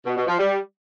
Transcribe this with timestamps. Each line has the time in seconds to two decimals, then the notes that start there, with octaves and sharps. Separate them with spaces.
0.06 B2
0.16 B2
0.27 F3
0.38 G3